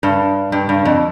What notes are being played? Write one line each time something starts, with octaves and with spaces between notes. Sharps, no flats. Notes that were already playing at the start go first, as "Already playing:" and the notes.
G2
G2
G2
F2